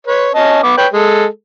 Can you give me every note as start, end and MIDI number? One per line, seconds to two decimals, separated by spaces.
0.07 0.30 71
0.07 0.30 73
0.35 0.59 61
0.35 0.59 75
0.35 0.59 81
0.63 0.75 59
0.63 0.75 71
0.63 0.75 86
0.77 0.87 71
0.77 0.87 73
0.77 0.87 79
0.93 1.26 56
0.93 1.26 69